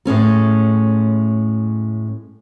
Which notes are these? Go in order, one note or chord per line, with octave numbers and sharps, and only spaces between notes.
A2 G#3 C#4 A4